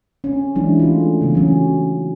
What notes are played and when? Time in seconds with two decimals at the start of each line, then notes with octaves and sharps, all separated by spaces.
0.24 C#4
0.55 E3 F#3 G#3 D4 E4
0.80 A3 C#4 F4
1.21 C#3 E3 B3
1.35 F#3 C#4